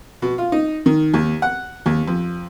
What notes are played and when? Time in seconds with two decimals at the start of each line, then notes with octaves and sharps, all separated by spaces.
0.22 B2
0.38 F4
0.52 D#4
0.86 D#3
1.14 D#2
1.42 F#5
1.86 D#2
2.08 F2